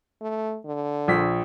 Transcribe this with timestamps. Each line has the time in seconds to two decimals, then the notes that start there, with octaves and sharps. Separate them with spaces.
0.21 A3
0.65 D3
1.08 A#1 B6